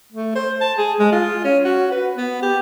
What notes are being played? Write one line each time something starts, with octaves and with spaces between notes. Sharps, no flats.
A3
C5
A5
G#4
G#3
F4
C#4
F#4
B4
B3
G4